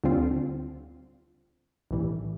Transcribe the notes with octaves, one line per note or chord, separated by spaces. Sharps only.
D2 D3 G3 C4 F4
B1 A2 E3 G3